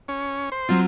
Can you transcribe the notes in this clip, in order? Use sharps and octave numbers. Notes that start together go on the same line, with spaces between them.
C#4
C5
F#3 C4 F4